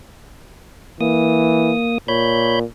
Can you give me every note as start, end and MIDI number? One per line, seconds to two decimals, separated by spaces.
1.01 1.72 52
1.01 1.98 58
1.01 1.98 87
2.08 2.64 46
2.08 2.59 73
2.08 2.59 83
2.08 2.59 91